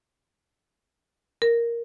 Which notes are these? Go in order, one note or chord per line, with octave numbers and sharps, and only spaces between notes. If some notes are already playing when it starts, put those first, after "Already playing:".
A#4